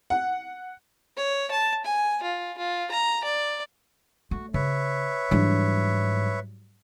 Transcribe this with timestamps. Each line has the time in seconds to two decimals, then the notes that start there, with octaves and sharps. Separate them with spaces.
0.10 F#5
1.17 C#5
1.51 A5
1.85 G#5
2.23 F4
2.57 F4
2.91 A#5
3.24 D5
4.31 A3 F#4
4.54 C#3 B4 C#5 E5
5.31 G#2 E3 F#3 G3 D4